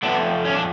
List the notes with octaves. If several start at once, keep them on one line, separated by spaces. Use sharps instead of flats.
F2 F3 A3 B3 D4
C#4
D4